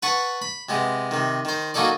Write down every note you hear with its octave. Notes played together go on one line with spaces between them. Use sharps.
B4 F#5 A5 C#6
B5
C3 G#3 B3
C3 D#3
D#3 C5
F#3 A#3 C#4 D#4 A4 D5